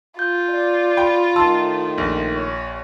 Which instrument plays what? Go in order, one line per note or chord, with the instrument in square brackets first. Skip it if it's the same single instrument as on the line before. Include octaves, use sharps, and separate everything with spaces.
[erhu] F4 [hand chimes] G6
[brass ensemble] D5
[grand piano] G5 [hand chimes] B5
[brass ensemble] A2 D#3 [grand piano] A5 E6 [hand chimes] C6
[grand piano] A#1
[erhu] C#5